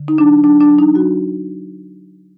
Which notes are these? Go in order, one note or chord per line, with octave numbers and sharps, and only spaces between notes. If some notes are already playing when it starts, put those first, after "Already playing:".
Already playing: D3
D#4
F#3 D4
F#3 D4
D4
F#3
D#4
F#3 F#4